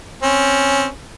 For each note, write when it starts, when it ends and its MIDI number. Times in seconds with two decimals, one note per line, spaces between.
0.22 0.87 60
0.22 0.87 61